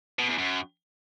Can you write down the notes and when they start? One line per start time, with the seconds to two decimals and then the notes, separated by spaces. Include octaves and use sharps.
0.19 B2
0.29 E2
0.38 F#2